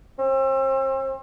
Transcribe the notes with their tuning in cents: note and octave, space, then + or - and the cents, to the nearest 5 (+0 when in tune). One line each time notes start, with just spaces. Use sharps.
C4 +40